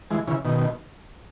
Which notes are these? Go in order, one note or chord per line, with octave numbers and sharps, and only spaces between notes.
E3 G#3
C#3 E3
B2 D#3